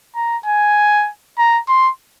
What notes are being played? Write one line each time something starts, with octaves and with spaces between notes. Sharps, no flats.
A#5
G#5
A#5
C6